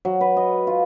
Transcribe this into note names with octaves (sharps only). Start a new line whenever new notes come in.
F#3
B4
D#5
F4